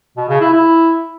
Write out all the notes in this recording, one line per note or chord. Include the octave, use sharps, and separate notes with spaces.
B2
C#3
E4
E4